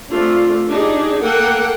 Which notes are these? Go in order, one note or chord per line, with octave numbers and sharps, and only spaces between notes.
A3 C4 D4 F4
D4 D#4 G4 G#4
A#3 A4 A#4 F#5 G5